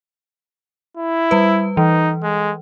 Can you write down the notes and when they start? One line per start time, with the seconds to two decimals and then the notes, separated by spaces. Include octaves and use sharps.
0.97 E4
1.31 G3 B4
1.77 E3 D#4
2.23 G#3